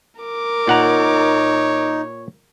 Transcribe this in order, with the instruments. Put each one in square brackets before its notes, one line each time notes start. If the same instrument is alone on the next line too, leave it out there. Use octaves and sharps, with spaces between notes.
[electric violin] A#4 D6
[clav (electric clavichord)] A#2 F#5 A#5 [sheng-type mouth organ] D#4 [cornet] C#5